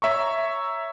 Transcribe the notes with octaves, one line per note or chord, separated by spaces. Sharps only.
C#5 E5 A#5 C#6